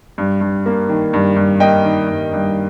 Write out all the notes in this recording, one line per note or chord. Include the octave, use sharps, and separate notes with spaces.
G2
G2
A#3
D#3
G2
G2
A#3 D#5 G5
D#3
G2
G2